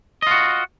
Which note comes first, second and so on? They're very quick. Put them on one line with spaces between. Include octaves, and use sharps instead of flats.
D#5 F4 F#4